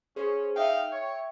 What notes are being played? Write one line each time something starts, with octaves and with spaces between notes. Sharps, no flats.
C#4 G#4 C5
D#4 E5 F5 G5
C#5